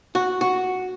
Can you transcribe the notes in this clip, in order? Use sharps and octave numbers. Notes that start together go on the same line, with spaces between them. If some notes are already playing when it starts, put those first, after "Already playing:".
F#4
F#4